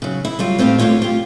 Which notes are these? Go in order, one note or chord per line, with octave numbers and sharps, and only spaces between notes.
C#3 F#3
E4
F#3 G3 F4
A2 C4 G4 C5 F5
D2 A#2 D3 F4 C#5
F4 G4